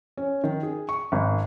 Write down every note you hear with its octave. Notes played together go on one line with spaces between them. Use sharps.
C#4
D#3
G#4
C#6
G#1